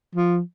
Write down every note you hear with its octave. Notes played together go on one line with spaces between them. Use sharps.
F3